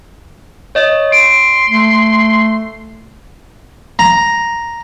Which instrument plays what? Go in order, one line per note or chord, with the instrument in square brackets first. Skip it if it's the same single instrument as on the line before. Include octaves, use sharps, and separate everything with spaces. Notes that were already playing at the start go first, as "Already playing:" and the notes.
[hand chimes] C#5 D#5
[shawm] C6 [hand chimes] D7
[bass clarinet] A3
[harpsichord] A#5